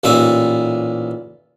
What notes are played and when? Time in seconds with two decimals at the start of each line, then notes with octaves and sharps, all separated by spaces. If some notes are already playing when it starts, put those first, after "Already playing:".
0.04 A1 A#2 D#4 E5